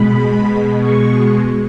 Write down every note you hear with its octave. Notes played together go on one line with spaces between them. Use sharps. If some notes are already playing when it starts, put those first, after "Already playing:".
Already playing: B2 G#3 B5
C#6